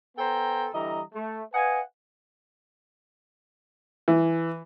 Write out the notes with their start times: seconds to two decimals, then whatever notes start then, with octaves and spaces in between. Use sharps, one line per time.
0.17 B3 A4 C5 G5 G#5 A#5
0.73 D3 E3 G3 D#5 A#5
1.14 A3
1.54 B4 D#5 F5 F#5 G#5
4.08 E3